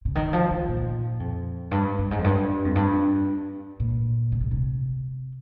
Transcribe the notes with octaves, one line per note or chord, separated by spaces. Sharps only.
C#3
D#3
F3
D#3
A#2
F2
G2
G2
G#2
F2
G2
F2
G2
A#2
C3
C#3
C3